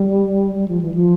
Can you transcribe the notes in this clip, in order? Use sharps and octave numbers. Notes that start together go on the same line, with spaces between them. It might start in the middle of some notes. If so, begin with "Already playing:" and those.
Already playing: G3
G3
F3
E3
F3